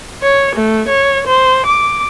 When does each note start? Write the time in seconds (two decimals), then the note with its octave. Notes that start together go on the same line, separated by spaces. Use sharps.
0.23 C#5
0.56 A3
0.88 C#5
1.27 C5
1.66 D6